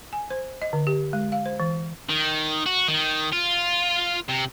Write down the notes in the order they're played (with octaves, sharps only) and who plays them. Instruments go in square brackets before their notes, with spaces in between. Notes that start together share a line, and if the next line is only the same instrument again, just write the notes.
[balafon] G#5
C5
D#5
D3
G4
G#3
F5
C5
E3
[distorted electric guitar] D#3
F#4
D#3
F4
C3